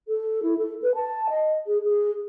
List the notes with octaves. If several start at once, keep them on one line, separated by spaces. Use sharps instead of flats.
A4
E4
A4
B4
A5
D#5
G#4
G#4